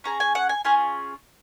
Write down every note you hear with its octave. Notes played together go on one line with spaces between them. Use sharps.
C#4 G#4 A#5
G#5
F#5
G#5
C#4 F4 G#4 G#5